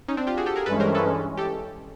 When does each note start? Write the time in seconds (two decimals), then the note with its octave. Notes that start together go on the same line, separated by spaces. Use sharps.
0.08 C#4 D#4
0.17 C4 D4
0.27 F4 G4
0.37 F#4 G#4
0.46 G4 A4
0.56 G#4 A#4
0.66 G2 E3 G#3 C#4 A4 B4
0.80 A#4 C5
0.95 A4 B4
1.37 G4 A4